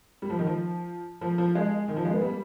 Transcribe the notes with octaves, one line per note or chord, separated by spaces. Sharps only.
G3
F3
D#3
F3
F3
F3
G#3
D#3
F3
G#3
B3
G3